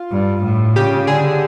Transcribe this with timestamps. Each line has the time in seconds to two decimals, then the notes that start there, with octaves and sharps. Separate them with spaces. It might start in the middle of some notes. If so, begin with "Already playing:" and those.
Already playing: F4
0.11 G2
0.44 A2
0.76 C#3 G4
1.07 D3 G#4